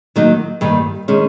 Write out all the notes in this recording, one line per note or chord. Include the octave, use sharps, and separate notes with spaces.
D#3 F#3 A#3 D#4
G2 D#3 G3 A#3
D#3 G#3 C#4